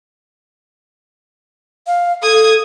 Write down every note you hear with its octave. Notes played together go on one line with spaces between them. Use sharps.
F5
A4 D#6 G#6